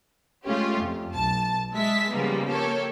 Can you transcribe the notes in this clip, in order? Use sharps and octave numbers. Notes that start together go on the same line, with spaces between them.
G#3 A3 C#4 F4 G4
F2
B1 A5
G#3 E5 A5 B6
C#3 F3 G3 G#3 A#3 B3
A#3 G4 A4 C#5